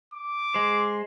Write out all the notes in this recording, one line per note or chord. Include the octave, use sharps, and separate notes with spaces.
D6
G#3 C5